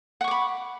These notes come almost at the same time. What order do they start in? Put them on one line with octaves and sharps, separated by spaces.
F#5 C#6 D6 B5